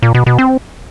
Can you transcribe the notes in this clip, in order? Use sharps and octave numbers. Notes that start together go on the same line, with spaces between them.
A#2
B2
B2
C4